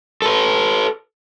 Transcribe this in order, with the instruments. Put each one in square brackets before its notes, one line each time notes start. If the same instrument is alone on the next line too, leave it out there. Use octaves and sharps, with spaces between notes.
[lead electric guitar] A4 B4